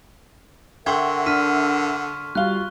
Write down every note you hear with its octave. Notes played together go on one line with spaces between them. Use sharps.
D3 A#4 E5 F#5 G5 C6 C#6 G#6
D4 F6 B6 D#7
G3 F4 F#4 F5 F#6 G7